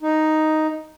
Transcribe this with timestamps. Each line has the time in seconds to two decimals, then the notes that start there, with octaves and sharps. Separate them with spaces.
0.02 D#4